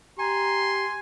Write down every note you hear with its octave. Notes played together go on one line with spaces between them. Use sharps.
G4 G#5 A#5 C6